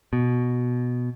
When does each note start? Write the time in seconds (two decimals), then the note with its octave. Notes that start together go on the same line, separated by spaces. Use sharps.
0.13 B2